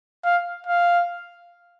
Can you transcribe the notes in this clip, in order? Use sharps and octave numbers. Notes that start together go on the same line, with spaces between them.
F5
F5